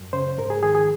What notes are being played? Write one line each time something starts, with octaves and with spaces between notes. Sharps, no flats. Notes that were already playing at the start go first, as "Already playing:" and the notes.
Already playing: F#2
C#3 C5
G#2 A#4
G#4
D#3 G#4
G#4